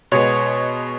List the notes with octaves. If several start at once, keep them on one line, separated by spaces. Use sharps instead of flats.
B2 G#3 B3 C#5